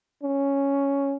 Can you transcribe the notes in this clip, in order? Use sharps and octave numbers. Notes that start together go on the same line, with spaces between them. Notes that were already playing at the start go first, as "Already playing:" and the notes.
C#4